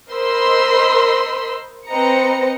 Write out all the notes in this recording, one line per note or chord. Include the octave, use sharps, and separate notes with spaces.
A#4 C5 D#5 B5 C6 E6
C4 B4 C5 D#5 A#5 C#7